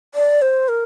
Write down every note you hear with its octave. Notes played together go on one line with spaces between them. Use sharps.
D5
C5
A#4